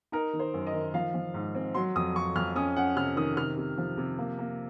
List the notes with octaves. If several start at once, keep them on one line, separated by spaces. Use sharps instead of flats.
D#4 A#4
D#3
C5
F#2
D#5
D#3
F3 F5
F3
G#2
C4
F#3 C6
F2 D#6
F2 C#6
F2 F6
C#4 D#6
C#4 F#5
C3 F6
D#3 D#6
C3 F6
C3
F3
C3
A#3
A#3